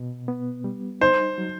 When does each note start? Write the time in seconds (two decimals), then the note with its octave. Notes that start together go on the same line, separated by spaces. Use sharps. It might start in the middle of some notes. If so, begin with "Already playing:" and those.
Already playing: B2
0.28 B3
0.64 G3
1.01 D#4 C5
1.38 F#3